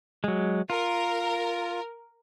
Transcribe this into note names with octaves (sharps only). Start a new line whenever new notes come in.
F#3 G#3
F4 A#4